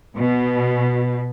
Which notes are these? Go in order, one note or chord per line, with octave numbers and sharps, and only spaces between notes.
B2